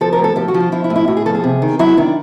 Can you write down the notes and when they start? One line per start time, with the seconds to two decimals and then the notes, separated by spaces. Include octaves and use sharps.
0.01 F3 A4
0.13 A#4
0.19 A2
0.24 A4
0.36 F3 G4
0.48 F#4
0.54 F3
0.60 F4
0.72 F3 E4
0.84 E4
0.90 A2
0.96 E4
1.08 A2 F#4
1.17 G#4
1.26 F3 A4
1.35 G#4
1.44 C3
1.62 D#3
1.79 F#3 E4
1.97 D#3 D4